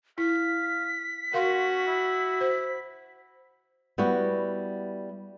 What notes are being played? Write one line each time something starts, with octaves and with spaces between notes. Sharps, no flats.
E4 F5 B6
C#4 F#4 A#4 F5 C6
E4
C5
G3 B3 E4 F#4